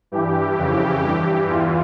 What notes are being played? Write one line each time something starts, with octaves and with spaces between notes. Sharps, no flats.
G2 E3 G4
F2 C#3 E3
G2 E3
E2 E3 F4